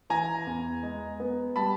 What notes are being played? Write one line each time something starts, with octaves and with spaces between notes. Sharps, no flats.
E3 G#5 A#5
E2
G#3
B3
G3 A5 B5